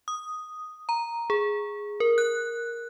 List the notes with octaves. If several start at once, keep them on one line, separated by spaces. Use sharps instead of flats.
D#6
A#5
G#4
A#4
F#6